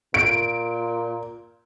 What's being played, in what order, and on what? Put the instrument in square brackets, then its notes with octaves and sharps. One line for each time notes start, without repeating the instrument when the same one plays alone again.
[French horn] A#2 [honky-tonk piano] D7